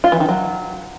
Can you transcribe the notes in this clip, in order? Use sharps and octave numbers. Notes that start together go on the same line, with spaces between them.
F4
E3
D#3
F#3